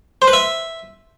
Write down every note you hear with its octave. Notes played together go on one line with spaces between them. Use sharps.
C5
B4
E5